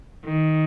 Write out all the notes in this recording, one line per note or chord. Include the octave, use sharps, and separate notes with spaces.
D#3